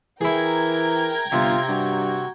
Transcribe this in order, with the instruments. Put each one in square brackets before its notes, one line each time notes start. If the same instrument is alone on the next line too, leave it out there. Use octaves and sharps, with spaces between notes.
[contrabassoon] E3 [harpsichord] E4 G#4 [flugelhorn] A#4 [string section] G5 A#5 G#6
[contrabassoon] G1 [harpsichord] C3 [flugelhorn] F4
[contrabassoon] G2 [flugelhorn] F#4